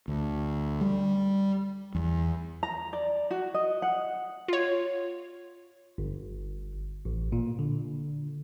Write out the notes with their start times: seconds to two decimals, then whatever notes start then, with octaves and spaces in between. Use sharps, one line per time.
0.08 D2
0.81 G3
1.95 E2
2.63 A#5
2.93 D5
3.31 F#4
3.54 D#5
3.82 F#5
4.48 F4 C#5
5.98 G1
7.05 A1
7.32 A#2
7.59 D3